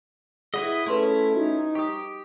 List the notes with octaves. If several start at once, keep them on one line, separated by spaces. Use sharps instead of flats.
E4 G#4 B4 D#5 F#5
A3 C#4 E4 B4 C6 C#6
D#4 F#4
G4 C#6 D#6